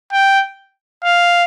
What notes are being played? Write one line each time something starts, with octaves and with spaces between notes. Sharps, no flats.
G5
F5